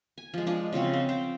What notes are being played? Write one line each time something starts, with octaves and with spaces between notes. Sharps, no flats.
G#5
F3 G#3
F3 G#3 D4
C#3 F3 C4 F#4
C4
C5 G5